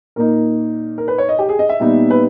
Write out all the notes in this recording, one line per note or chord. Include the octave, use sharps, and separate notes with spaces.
A#2 A#3 D#4 A#4
A#4
B4
C#5
D#5
G4
G#4
D#5
E5
A#2 G3 B3 D#4
B4